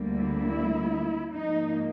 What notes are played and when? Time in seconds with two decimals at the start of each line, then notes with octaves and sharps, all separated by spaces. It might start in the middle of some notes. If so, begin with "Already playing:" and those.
Already playing: D2 D3 G3 A#3
0.18 E4
1.33 G#2 F3 A#3 D#4